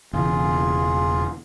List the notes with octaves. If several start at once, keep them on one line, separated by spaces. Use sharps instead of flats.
E1 E2 C#3 F4 G#4